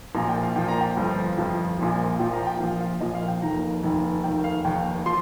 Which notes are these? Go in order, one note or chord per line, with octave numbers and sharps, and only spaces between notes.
A#1 A#2 F3 A#5
G5
F5
A#1 A#2 F3 G5
A#5
G5
G1 F2 F3
G1 F2 F3
A#1 A#2 F3
A#1 A#2 F3 G5
A#5
G5
A#1 A#2 F3 F5
F5
A#1 A#2 F3 D#5
F5
G5
F1 D#2 D#3 A#5
F1 D#2 D#3
F1 D#2 D#3 G5
F5
F1 D#2 D#3 G5
F3 C6